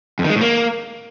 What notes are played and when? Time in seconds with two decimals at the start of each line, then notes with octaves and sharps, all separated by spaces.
0.19 F2
0.25 D#3
0.30 G#3
0.36 A2
0.41 A#3